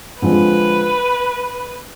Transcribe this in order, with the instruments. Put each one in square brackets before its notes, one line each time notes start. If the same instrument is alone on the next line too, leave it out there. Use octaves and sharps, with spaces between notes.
[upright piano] D3 F3 G#3 C4 [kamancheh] B4